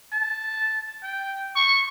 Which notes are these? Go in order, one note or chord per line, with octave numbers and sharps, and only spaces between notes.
A5
G5
C#6